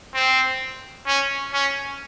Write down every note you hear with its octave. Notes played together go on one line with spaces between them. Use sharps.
C4
C#4
C#4